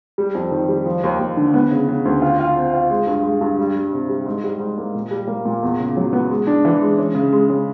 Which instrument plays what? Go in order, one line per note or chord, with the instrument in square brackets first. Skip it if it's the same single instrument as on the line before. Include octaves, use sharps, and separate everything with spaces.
[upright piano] G3
F2
D#3
G3
F3
D#2
D#2
D3
B3
C#3
C#3
D2
F4
F4
C4
F4
G#3
G2
G#3
G2
G3
G3
C3
G3
G#2
G3
G#2
A#3
A#2
G3
A#3
A#2
E2
C#3
F#3
B3
G#3
D4
E3
G#3
C#4
C#3
G#3
C#3